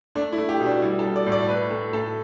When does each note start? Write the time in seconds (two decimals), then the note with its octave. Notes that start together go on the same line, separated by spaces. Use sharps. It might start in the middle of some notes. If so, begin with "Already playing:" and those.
0.15 A3 D4
0.32 E4
0.38 A3
0.49 G4
0.60 B2
0.66 D4
0.82 G3 E4
0.99 A4
1.05 G3
1.16 D5
1.26 A2
1.32 D5
1.49 A3 B4
1.71 A3 A4
1.93 A2 A4